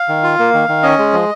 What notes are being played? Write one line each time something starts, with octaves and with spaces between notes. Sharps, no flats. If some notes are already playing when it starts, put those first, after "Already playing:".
Already playing: F5
D#3
F4
A#3
D#3
D#3
C#4 D#5
G#3
F3